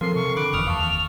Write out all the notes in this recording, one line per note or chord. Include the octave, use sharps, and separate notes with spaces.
F3 C4 A4 A#4 C6
C3 C#6
D3 B5 D6 F#6 D7
F#1 F2 E3 C#6 D#6 F6 F7
D#2 F5 A5
F5 C#6